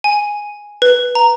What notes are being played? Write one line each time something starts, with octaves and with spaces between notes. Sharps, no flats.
G#5
B4
A#5